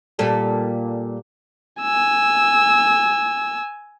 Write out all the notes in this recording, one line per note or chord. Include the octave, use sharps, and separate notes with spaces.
A#2 G3 A4
G#5 E6